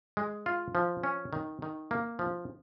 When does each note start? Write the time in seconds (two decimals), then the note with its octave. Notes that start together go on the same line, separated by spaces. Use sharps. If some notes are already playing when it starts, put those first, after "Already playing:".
0.17 G#3
0.46 F4
0.75 F3
1.03 C#4
1.33 D#3
1.62 D#3
1.91 A#3
2.19 F3